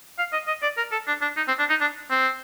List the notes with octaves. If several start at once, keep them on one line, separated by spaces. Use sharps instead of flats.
F5
D#5
D#5
D5
A#4
A4
D4
D4
D#4
C4
D4
D#4
D4
C4